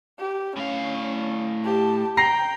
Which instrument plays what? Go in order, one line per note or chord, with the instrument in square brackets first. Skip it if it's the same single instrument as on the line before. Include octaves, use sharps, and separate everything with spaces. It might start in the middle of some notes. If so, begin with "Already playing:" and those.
[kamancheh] G4
[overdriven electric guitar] A2 F5 [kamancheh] C#4
[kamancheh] G4 A5
[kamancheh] G5 [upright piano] A#5 A#6 C7